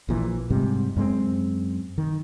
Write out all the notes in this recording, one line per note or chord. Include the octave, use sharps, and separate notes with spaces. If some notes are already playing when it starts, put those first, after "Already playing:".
A#1 A#2 E3
G#2 C3 G3
F#2 G#3 A3 C4
D#3